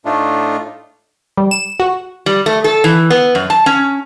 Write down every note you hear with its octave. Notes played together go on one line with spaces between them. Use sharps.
A2 A3 D4 D#4 F4
G3
E7
F#4
G3
A3
A4
E3
B3
F#2
A5
C#4